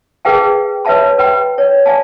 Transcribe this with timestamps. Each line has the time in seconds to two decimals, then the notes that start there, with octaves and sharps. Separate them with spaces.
0.25 G#4 A#4 B4 F5 G5 A5
0.85 B4 C#5 E5 F5 A5 B5
1.18 B4 G5 B5
1.58 C#5
1.86 D5 F5 G#5 A5